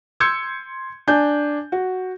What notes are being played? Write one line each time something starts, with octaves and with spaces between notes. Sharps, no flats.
C6 E6 G6 G#6 C#7
D4 G#5 G6
F#4